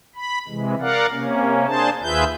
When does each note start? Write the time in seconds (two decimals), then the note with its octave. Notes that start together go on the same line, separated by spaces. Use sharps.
0.15 B5
0.48 C3 E3 G#3
0.80 A#4 D5 F5 F#5
1.12 C3 A#3 C#4
1.66 A#3 D4 G#4 C5 A5
2.02 D#2 F4 G#4 B4 E5 G6